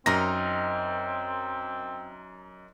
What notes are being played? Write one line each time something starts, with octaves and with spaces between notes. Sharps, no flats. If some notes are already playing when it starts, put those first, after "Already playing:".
F#2 C4 D#4 A#4 A#6